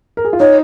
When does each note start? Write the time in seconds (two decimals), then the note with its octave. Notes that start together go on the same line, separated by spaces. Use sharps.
0.17 A#4
0.25 G#4
0.33 F4
0.40 D#4 C#5